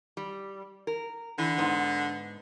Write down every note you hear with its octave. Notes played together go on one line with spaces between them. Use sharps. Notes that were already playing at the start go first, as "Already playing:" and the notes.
G3
A#4
D3 E3
G#2 B3